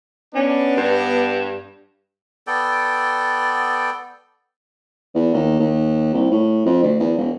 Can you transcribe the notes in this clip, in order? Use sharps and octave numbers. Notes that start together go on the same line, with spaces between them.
B3 C#4 D4
G2
B3 A4 D5 G5
E2
D#2
D#2
C2
A2
F2
D2
E2
E1